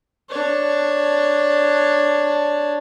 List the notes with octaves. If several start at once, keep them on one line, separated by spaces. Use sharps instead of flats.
D4 C#5